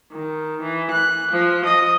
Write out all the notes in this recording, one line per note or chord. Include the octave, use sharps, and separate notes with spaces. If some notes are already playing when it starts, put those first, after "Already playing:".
D#3
E3
F#6
F3
D#5